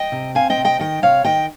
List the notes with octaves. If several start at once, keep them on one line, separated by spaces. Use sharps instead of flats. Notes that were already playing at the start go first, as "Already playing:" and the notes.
Already playing: D#5 G5
C3
C4 F5 G#5
D#5 G5
C3
D#5 G5
D#3 D#5 G5
C3 C#5 F5
D#3 D#5 G5